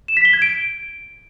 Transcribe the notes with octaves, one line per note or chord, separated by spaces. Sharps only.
E7
B6
G7
G#6
D7